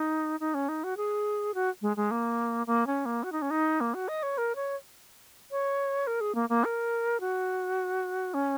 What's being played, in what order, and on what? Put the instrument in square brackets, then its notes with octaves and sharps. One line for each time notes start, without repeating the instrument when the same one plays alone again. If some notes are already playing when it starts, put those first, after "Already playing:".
Already playing: [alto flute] D#4
D#4
C#4
D#4
F#4
G#4
F#4
G#3
G#3
A#3
A#3
C#4
A#3
F#4
D#4
C#4
D#4
A#3
F#4
D#5
C#5
A#4
C#5
C#5
A#4
G#4
A#3
A#3
A#4
F#4
C#4